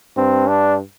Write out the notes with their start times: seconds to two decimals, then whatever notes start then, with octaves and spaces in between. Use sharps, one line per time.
0.17 G2 C4
0.48 D4